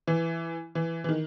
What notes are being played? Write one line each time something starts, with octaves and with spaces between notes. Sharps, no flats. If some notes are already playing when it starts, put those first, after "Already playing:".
E3
E3
E3
D#3